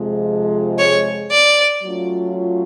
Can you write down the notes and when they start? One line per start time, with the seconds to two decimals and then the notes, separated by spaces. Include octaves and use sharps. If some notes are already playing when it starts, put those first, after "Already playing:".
Already playing: F2 C3 F3 G#3
0.79 C#5
1.31 D5
1.83 F#3 A3 C#4 F4